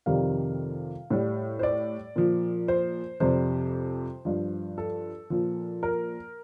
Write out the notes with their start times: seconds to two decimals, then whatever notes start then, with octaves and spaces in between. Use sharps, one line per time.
0.06 F2 C3 D#3 G3 F5
1.10 A2 G3
1.59 C5
1.63 D5
2.16 A#2 F3
2.68 C5
3.20 F2 C3 G3 C5
4.25 G2 F3
4.78 A4
5.30 A#2 F3
5.83 A#4